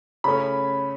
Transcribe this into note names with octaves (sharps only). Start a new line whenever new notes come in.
C#3 A3 C#4 B5